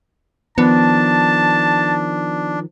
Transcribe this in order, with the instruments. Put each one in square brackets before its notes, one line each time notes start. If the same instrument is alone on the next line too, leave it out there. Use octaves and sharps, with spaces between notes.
[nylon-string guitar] D#3 F3 [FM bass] B3 [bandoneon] D4 [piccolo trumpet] A5